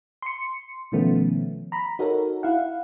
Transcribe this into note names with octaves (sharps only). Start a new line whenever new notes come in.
C6 C#7
B2 D#3 F3 A3 B3 C#4
A#5 B5
D#4 F#4 A4 A#4 C#5
E4 F5 F#5